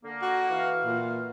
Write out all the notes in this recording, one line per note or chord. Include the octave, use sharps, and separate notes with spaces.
D3 A#3
F#4
E3 F5
A#2